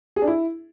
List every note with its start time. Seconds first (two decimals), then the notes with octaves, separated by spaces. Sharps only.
0.16 G#4
0.22 D4
0.27 E4